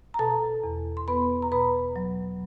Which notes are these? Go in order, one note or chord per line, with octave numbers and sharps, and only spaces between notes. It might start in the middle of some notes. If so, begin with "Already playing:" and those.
A#5
B2 A4 A5
E2
C6
B3 B4 B5
A#5
B2 B4 B5
F#3